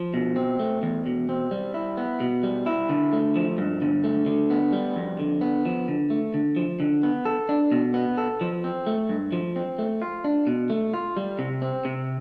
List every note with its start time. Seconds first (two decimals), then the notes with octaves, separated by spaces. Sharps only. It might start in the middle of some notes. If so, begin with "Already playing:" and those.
Already playing: F3
0.14 B2
0.36 C4
0.59 A3
0.83 E2
1.06 B2
1.29 C4
1.51 G3
1.74 E4
1.97 B3
2.20 B2
2.43 G3
2.66 E4
2.89 D3
3.13 A3
3.36 F3
3.58 G2
3.82 D3
4.04 A3
4.26 D3
4.50 B3
4.73 G3
4.96 F2
5.19 D3
5.41 B3
5.65 F3
5.88 D3
6.10 A3
6.34 D3
6.56 F3
6.80 D3
7.03 B3
7.25 A4
7.49 D4
7.72 B2
7.94 B3
8.17 A4
8.41 F3
8.64 C4
8.87 A3
9.09 G2
9.32 F3
9.56 C4
9.79 A3
10.02 F4
10.24 D4
10.47 B2
10.70 A3
10.94 F4
11.17 G3
11.39 C3
11.62 C4
11.85 C3